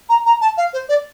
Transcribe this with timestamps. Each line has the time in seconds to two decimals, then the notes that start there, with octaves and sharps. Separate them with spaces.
0.09 A#5
0.26 A#5
0.41 A5
0.57 F5
0.73 C5
0.89 D5